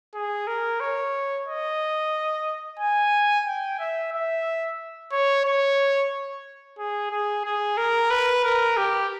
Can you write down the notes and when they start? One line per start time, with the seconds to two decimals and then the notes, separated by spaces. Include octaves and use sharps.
0.14 G#4
0.47 A#4
0.80 C#5
1.47 D#5
2.79 G#5
3.46 G5
3.79 E5
4.13 E5
5.12 C#5
5.45 C#5
6.78 G#4
7.11 G#4
7.45 G#4
7.77 A#4
8.11 B4
8.44 A#4
8.77 G4